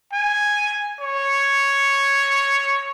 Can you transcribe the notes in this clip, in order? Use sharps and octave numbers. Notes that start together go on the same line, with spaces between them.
G#5
C#5